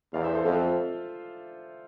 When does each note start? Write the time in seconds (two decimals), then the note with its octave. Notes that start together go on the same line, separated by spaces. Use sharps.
0.13 E2 D5 F5
0.24 C5 E5
0.35 A4 C5
0.45 F2 F4 A4